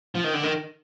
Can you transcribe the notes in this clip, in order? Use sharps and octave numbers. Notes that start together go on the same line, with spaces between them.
F3
D#3
D3
D#3